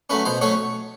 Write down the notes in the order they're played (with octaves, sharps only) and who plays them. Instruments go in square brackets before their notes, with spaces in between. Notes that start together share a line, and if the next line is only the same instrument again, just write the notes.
[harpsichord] F#3 A3 C#4 B4
B2 C5
F#3 A3 C#4 C#5